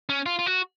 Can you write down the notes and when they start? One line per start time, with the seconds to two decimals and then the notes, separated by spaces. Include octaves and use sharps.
0.09 C#4
0.26 F4
0.39 F4
0.46 F#4